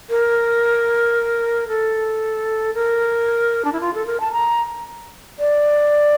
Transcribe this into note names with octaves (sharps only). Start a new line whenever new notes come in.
A#4
A4
A#4
D4
E4
F4
A4
A#4
A5
A#5
D5